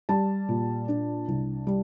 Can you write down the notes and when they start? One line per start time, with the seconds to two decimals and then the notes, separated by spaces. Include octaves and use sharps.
0.09 G3 A5
0.49 A#2
0.88 D4
1.28 C2
1.67 G3